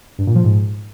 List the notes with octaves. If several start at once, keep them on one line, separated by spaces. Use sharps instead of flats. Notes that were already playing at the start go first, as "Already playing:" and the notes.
G2
A#2
F3
G#2